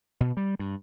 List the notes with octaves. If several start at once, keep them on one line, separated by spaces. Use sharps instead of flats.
B2
G3
G2